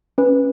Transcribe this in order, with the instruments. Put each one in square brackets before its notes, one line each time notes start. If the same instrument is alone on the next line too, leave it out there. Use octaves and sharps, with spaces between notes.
[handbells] C#4 B4